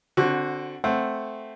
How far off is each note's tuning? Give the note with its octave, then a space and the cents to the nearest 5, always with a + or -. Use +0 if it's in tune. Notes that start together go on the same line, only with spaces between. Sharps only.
D3 +0 C4 +20 F#4 +0
A3 +0 C4 +0 F#5 +0